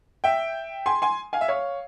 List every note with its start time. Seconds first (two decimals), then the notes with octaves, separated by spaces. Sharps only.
0.24 E5 G5
0.86 G#5 C6
1.02 G#5 C6
1.33 F5 G#5
1.41 E5
1.48 C#5 F5